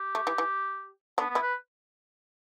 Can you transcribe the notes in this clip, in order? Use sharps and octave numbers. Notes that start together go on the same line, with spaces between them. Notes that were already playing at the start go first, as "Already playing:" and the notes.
Already playing: G4
A3
E3
E3
D3 B3 D4
B3
E3 E4
B4